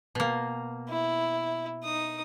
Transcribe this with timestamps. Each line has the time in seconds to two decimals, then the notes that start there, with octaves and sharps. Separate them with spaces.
0.15 B2 A#3
0.89 E4
1.84 D#4 D#6